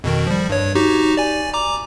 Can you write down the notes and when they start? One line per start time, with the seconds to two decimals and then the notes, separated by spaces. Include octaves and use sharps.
0.04 F2 B2 D#3
0.27 F3 G3
0.49 G2 C#5
0.75 D#4 F#4 G4
1.17 D5 G#5
1.54 A#5 D6